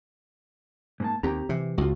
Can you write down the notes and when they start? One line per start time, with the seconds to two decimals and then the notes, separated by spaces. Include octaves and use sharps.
1.00 G#2 A#3 A5
1.23 D#2 C4 G4 A#5
1.49 C3 E3
1.78 C#2 F4 F#4